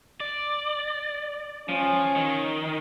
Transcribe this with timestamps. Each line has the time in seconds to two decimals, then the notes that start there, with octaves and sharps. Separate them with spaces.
0.20 D5
1.69 F3 C#4
2.15 D#3